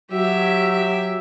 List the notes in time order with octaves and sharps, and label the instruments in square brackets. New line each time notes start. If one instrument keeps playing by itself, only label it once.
[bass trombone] F#3 [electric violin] G4 E5